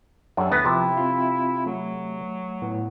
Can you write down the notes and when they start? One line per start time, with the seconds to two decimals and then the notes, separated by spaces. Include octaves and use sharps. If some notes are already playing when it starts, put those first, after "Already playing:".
0.37 F#2 D4 G4 A4
0.52 D2 B3 E4 B4 A6 A#6
0.66 C3 F3
0.97 C4 F4
1.66 F#3 A3
2.62 A2 B3